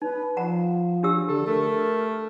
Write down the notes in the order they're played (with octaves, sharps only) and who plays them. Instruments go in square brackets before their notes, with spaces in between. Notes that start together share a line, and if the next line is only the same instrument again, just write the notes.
[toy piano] D#4 [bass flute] B4
[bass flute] F3 [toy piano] F#5 A#5
[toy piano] D4 G4 E6
[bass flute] D3 [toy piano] G4 [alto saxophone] A4
[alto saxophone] A3 [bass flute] A#4